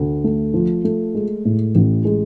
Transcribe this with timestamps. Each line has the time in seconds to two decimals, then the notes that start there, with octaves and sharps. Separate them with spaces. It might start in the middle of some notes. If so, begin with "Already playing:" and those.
Already playing: D2
0.24 A3
0.54 F3
0.84 A3
1.15 G#3
1.45 A2
1.75 A1
2.05 G#3